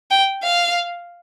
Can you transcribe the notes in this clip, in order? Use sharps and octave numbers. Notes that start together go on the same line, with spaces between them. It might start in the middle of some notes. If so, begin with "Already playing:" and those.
G5
F5